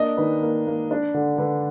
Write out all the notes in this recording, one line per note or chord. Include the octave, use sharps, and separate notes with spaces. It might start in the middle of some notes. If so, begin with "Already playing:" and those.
Already playing: A#3 D4 D#5
D#3 B4
A#3
A#3
D4
D3
D3 B4